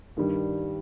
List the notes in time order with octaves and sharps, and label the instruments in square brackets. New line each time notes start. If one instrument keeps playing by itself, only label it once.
[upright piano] G2 D#3 G3